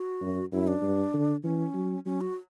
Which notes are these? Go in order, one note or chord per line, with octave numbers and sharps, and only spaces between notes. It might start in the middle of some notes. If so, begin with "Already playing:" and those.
Already playing: F#4
F#2
F#2 E4
D4
G2
D3
E3 C#4
F#3
F#3 C#4
F#4